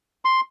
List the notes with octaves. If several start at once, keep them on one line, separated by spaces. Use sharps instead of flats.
C6